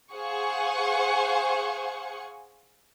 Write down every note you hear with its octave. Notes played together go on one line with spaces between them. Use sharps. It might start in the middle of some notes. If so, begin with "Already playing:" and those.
G#4 C5 F5 F#5 G#5 C#6